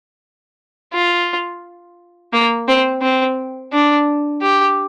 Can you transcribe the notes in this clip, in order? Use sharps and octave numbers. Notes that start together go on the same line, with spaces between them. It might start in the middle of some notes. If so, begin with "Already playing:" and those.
F4
A#3
C4
C4
D4
G4